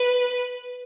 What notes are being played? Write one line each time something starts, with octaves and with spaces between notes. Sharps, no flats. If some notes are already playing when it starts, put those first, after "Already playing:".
Already playing: B4